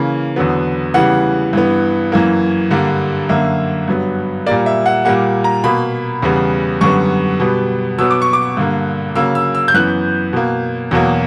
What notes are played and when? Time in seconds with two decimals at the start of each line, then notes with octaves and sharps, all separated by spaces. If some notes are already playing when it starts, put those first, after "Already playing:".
Already playing: C#3 E3 A#3
0.36 E2 D3 F#3 B3
0.94 C#3 E3 G3 B3 F#5
1.53 G2 E3 B3
2.12 F#2 E3 A#3
2.71 G2 D3 G3 A#3
3.29 F#2 D3 A#3 E5
3.88 G2 F#3 B3
4.46 A#2 G3 A#3 D5
4.66 E5
4.86 F#5
5.05 A#2 G3 A#3 F#5
5.44 A#5
5.64 B2 A#3 B5
6.22 E2 C#3 G3 B3
6.81 F#2 D3 G3 B3 C#6
7.40 B2 G3 B3
7.99 B2 F#3 B3 E6
8.11 D6
8.22 C#6
8.33 D6
8.57 G2 D3 A#3
9.15 C#3 F#3 A#3 E6
9.35 E6
9.55 E6
9.68 G6
9.74 F#2 E3 B3 F#6
10.33 B2 A#3
10.91 E2 B2 F#3 A#3